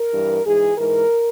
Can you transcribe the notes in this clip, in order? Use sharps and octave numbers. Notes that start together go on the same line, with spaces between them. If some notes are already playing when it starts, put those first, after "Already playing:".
Already playing: A#4
G2 E3
G#2 E3 G#4
G#2 E3 A#4